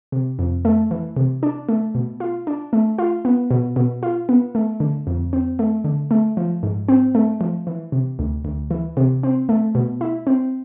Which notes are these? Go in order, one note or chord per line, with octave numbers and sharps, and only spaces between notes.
C3
F2
A3
E3
C3
D4
A3
B2
F4
D4
A3
F4
B3
B2
B2
F4
B3
A3
D3
F2
C4
A3
D3
A3
F3
G#2
C4
A3
F3
E3
C3
D2
D2
E3
C3
C4
A3
B2
E4
C4